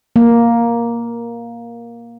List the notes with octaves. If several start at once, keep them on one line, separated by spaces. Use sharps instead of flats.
A#3